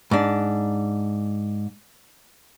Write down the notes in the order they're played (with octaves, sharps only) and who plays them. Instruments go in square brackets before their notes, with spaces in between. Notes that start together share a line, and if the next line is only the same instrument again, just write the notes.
[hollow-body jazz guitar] G#2 D4